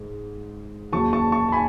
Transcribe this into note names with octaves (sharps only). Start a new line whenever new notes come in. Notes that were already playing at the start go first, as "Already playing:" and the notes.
Already playing: G#2
D#2 C#3 F#3 A5 C#6
A5 C#6
A5 C#6
A5
G#5 B5